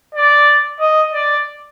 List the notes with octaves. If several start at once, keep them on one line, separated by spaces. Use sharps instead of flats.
D5
D#5
D5